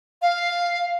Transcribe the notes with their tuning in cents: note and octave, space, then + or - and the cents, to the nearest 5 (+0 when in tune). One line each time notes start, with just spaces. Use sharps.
F5 +0